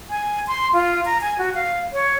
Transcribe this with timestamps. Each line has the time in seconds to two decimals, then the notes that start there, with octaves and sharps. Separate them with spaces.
0.10 G#5
0.47 C6
0.73 F4
1.05 A#5
1.21 G#5
1.39 F#4
1.55 F5
1.93 C#5